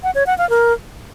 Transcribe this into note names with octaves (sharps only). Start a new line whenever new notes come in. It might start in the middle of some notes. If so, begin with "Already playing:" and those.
F#5
C#5
F#5
F5
A#4